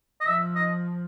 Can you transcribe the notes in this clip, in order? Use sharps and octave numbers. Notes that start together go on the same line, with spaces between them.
D#5
F3 E5
D#5